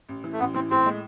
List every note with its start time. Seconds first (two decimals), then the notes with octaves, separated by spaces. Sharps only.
0.09 A1
0.24 E3
0.33 A3
0.40 A1 B3
0.54 E3 C4
0.70 A2 C4
0.86 G#3